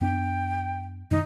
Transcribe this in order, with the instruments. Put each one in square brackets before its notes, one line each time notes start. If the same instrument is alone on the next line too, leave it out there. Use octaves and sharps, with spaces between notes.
[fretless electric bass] F#2 B3 D4 [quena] G5
[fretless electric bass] F#2 D#3 A3 [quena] D#4